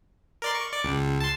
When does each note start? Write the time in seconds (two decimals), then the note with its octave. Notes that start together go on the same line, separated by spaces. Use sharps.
0.42 A#4 D5 C6
0.54 C#6
0.72 D5
0.85 C#2
1.20 A5 C6